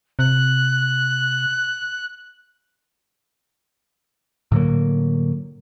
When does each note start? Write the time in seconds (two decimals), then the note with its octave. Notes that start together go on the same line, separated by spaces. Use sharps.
0.19 C3 F#6
4.52 A2 D3 F#3 A#3